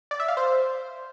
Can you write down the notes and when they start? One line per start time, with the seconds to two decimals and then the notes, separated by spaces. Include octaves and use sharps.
0.11 D5
0.20 E5
0.28 F5
0.37 C5